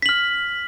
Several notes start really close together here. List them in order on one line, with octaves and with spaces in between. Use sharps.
B6 F#7 F6